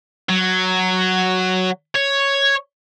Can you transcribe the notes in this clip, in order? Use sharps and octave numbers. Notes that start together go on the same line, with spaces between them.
F#3
C#5